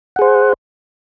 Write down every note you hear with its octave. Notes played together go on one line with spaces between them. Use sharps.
G#4 C5 F#5